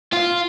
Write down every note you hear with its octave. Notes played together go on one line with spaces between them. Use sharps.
F4